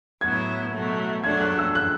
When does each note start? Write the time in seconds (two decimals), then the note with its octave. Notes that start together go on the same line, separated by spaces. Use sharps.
0.21 A2 F#3 B3 E4 G#6
0.73 B2 F#3 A3
1.24 F#3 A3 D4 G#6
1.41 F#6
1.58 E6
1.75 F#6